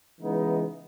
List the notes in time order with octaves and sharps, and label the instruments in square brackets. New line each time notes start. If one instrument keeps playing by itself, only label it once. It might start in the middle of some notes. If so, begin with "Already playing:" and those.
[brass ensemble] C#3 E3 G#3 B3 D#4